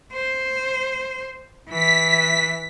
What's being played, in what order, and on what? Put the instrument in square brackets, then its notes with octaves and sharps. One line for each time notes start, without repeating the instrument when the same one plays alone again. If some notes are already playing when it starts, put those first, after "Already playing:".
[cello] C5
[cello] E3 [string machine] B6